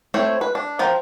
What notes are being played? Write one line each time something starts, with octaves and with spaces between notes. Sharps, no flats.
A3 C4 E4 C5 C#5
B4
D4
F3 F4 A#4 G5